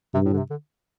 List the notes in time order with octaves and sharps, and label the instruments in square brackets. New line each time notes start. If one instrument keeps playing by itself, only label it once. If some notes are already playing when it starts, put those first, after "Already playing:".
[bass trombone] G2 [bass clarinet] C3
[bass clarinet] A2
D3
C3
D3